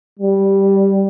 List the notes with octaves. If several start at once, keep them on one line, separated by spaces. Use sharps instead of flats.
G3